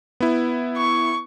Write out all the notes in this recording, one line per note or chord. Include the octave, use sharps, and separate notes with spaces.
B3 E4
C#6